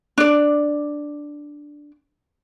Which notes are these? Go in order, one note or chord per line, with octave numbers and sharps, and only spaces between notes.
D4 D5